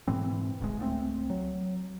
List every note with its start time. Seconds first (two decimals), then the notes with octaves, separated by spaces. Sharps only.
0.08 G#2 B2 E3 C4
0.60 D1 A1 D2 G#3
0.79 C#2 A3 B3 C4
1.30 F#3